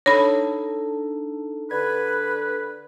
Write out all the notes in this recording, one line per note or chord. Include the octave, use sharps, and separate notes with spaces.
D4 D#4 A4 C#5 B5
D3 B4 G#6